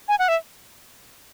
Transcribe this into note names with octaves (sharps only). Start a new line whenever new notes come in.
G#5
F#5
E5